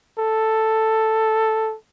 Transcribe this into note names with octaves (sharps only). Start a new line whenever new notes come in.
A4